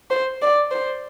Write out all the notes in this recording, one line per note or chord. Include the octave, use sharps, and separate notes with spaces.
C5
D5
C5